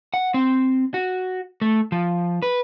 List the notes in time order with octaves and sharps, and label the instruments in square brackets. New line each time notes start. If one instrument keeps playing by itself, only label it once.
[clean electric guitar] F#5
C4
F#4
A3
F3
B4